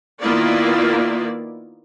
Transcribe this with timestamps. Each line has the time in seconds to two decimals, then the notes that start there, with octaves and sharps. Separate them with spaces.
0.21 D#3 A#3 B3 E4 F4 D5